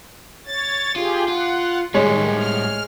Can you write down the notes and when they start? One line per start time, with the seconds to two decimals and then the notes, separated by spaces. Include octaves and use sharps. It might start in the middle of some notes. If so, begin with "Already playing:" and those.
0.46 C#5 A6
0.96 F4 G4 G#4
1.28 F4 F#5
1.94 A2 D#3 G3 G#3 C#5
2.37 F6